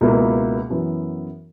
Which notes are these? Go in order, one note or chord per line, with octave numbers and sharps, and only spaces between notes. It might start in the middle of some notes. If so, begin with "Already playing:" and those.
C#2 B2 A#3 E4
F#2 E3 B3 E4